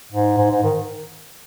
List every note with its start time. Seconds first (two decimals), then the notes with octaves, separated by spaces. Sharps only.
0.13 G#2
0.38 G#2
0.51 G#2
0.63 D#3